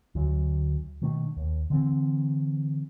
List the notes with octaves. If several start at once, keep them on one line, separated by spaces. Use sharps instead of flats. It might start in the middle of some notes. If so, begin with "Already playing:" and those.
D2 D3 F#3
B2 D#3 A3 D4
D#2
D3 E3 C4